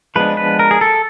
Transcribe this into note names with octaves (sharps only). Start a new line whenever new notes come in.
F3 G#3 B3 D4 B4
B4
A#4
G#4
A4